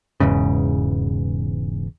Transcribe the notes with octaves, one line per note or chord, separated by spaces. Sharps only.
E1 E2 G#2 C#3